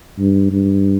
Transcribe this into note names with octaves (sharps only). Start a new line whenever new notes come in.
G2
G2